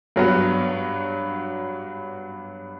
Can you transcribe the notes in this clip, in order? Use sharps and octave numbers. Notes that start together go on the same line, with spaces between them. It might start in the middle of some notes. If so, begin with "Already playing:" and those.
G2 F#3 B3